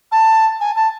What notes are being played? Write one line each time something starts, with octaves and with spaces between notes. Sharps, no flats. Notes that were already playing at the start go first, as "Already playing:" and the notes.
A5
G#5
A5